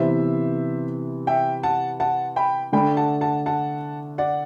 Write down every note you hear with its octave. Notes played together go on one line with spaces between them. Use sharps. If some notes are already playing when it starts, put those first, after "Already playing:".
Already playing: C3 E3 B3 E4 C5 E5
E5 G5
F#5 A5
F#5 A5
G5 B5
D3 A3 D4 G5 B5
F#5 A5
F#5 A5
F#5 A5
D5 F#5